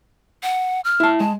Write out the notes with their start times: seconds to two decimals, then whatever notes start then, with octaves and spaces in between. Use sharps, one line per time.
0.43 F#5
0.85 F6
1.00 E4 A5
1.20 G#3 A5